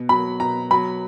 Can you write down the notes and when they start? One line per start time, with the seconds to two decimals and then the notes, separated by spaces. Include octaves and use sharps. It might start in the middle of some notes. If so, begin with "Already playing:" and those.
Already playing: B2
0.09 F#3 B5
0.40 B2 A#5
0.71 F#3 B5